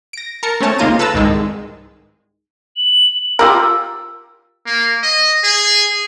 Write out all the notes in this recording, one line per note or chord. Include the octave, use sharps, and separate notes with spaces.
A#6 D7
A#4 A5 A#5 C#7
A3 C4 C#4 C#5 A5
C#2 A#3 D#4 F4 A#5 D#7
A4 B4 A5 A#5 E6
C2 G#2 D#3 G#3
F#7
F4 G4 A#4 E6
A#3
D#5
G#4